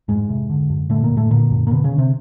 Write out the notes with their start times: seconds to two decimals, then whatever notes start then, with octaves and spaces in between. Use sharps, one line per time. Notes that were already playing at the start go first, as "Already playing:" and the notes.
0.08 F2 G#2 G#3
0.29 C3
0.50 D3
0.70 F#2
0.90 A2 D3 A3
1.03 A#2 A#3
1.10 F#2
1.17 A2 A3
1.31 A#2 D3 A#3
1.51 F#2
1.67 A#3
1.71 B2 D3 B3
1.84 C#3 C#4
1.92 D3
1.98 C3 C4